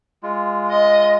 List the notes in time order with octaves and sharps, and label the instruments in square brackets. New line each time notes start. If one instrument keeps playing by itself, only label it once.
[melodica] G#3 F4
[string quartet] D#5